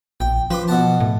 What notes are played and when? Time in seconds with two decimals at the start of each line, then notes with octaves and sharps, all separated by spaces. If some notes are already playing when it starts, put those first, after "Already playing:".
0.20 A#1 G5
0.50 F3 B4 C6 D6
0.68 B2 F#5 A5
1.00 A2